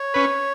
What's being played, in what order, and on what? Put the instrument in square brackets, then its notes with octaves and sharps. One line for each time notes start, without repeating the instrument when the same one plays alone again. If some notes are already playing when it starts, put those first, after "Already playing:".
Already playing: [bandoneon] C#5
[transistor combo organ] C#4 B4